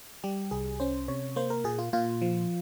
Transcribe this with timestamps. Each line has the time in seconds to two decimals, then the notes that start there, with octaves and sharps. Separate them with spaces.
0.24 G3 G4
0.51 C2 G#4
0.80 C#4 C5
1.08 C3 C#5
1.36 A#3 C5
1.50 A#4
1.64 A#2 G#4
1.78 F4
1.93 A#2 F4
2.22 F3